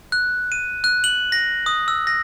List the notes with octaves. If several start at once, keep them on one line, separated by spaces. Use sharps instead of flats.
F#6
D#7
F#6
F#7
A#6
D#6
E6
A#6